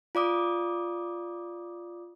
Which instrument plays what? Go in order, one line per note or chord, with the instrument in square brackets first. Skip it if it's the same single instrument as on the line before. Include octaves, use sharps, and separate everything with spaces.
[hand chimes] F4 D5 D6 D#6